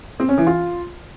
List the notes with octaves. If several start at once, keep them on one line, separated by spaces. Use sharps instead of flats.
C4
C#4
E3
F4